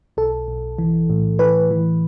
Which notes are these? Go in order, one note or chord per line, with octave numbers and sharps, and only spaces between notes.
B1 A4
B1
E3
A2
E3 B4
E3